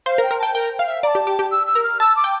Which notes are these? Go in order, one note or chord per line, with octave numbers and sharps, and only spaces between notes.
C5 F5
A#4
G5
A#4
G5 A5
A#4 G5
F5
E5
D5 A5 A#5
G4
G4
G4
E6
E6
A#4
F6
A5 E6
D6
G5